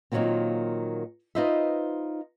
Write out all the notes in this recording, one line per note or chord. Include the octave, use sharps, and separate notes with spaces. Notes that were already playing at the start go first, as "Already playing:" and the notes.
A#2 D#3 F3 F#3 A#3 C4
D#4 F4 B4 C5 D#5 E5